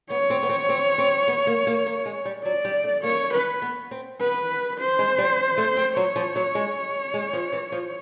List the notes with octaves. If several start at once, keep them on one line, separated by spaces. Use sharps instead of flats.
B3 C#5
C4
B3
C4
C4
C4
B3
A#3
A#3
A#3
G#3
G3
F#3 D5
G3
A3
A#3 C#5
B4
B3
C4
B3 B4
C5
G#3
G3
A3
C4
F#3 C#5
F3
F#3
G#3
G#3
F3
E3
F3